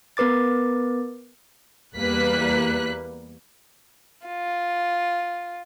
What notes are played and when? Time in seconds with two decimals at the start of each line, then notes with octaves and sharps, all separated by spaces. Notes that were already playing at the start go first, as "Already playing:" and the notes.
0.17 B3 A#4 B4 D6 A6
1.96 E2 G3 A#3 B4 F#6 B6
4.27 F4